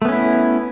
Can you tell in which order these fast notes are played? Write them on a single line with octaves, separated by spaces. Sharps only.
A3 B3 C#4 E4